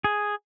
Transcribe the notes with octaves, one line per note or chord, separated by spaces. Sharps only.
G#4